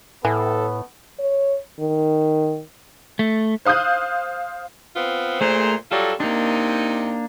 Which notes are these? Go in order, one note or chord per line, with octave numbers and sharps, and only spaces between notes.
A2 E3 A3 B3 A4
C#5
D#3
A3
C5 F5 D#6 F#6 G6
B3 C4 F4
A#2 A3 G#4 A#4 C5
F#3 G3 F4 A4
C3 A#3 D4 D#4